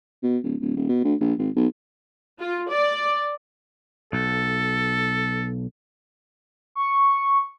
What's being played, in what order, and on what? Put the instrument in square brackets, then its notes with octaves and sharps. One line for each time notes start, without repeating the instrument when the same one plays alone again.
[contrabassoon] B2
D1
D1
D#1
B2
D2
A#1
G#1
B1
[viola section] F4
D5
[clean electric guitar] B1 [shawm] A4
[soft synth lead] C#6